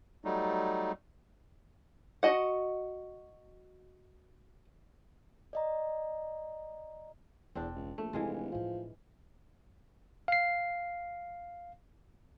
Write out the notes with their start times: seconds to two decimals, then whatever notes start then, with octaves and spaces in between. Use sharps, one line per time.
0.25 F#3 G3 A3 D#4
2.23 F#4 D#5 F#5
5.53 D5 D#5 A#5
7.55 E1 E2 C4 D4
7.75 C#2
7.98 A#1 A3
8.13 F1 C3 E3 G#3 D4 F4
8.52 A2 F3 E4
10.28 F5 C7